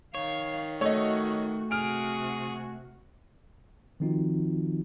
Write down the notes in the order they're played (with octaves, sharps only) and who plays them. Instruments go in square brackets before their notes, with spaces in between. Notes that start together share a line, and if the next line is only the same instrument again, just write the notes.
[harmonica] D#3 [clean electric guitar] C#5 [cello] F5
[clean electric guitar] A3 [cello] F#4 [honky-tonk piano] C#5 D#5
[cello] C3 F#4 [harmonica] G#4 [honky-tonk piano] F6 D7
[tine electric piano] D#3 F3 C4 D#4 F4 F#4